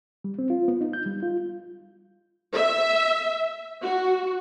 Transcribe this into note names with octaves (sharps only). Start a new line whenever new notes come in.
G3
C4
F4
B3
D#4
G6
G3
F4
E5
F#4